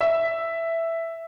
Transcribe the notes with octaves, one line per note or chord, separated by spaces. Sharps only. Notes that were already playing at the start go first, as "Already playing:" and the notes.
E5